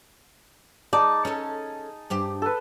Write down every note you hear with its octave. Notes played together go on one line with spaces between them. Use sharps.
D#4 G#4 D5 A5
C#4 A4
G2 G4 C5
A4 B4